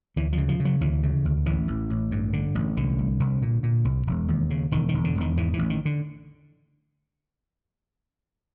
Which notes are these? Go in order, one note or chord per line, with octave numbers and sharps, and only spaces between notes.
D2 E3
F3
C#3
F3
C#3
F#3
D2 E3
C#3
D2
A1 E3
A1
A1
G2
D3
A1
C2 D3
C2
C2
A#2
A#2
C2
E1
D#2
C#3
E1 D#3
D#3
E1
D3
E1
D#3
G#2 E3
E3
A1
D#3
D3